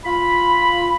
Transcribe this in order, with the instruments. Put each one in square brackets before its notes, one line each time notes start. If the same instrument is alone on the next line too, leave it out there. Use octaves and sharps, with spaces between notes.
[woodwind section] F4 B5